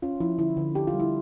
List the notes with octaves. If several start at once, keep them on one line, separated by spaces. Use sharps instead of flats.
C#4 F4
F3 E4
D3 E4
D3
D4 G4
F4
G3
E4